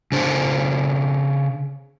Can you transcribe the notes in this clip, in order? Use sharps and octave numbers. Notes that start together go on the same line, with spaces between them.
C#3 D4 C5